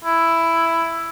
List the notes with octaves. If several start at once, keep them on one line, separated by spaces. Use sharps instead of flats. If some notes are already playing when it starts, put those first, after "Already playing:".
E4